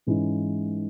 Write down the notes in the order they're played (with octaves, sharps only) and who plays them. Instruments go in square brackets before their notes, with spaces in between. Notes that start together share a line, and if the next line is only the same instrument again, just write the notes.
[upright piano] G#2 E3 G#3 C#4 E4